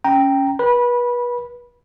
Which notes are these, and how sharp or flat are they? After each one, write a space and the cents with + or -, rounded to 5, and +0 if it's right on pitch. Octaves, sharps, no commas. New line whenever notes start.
C#4 +0 G5 +0 A#5 +0
B4 -30 B5 -15